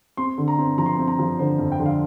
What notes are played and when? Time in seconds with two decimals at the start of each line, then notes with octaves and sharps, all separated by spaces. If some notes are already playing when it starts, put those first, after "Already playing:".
0.17 C4 C6
0.38 D3
0.48 A#5
0.58 C4
0.78 F3 A#5
0.86 C6
0.95 C4 A#5
1.08 A#5
1.19 F3
1.39 D3 C5
1.58 F2
1.72 G5
1.79 D3
1.86 F5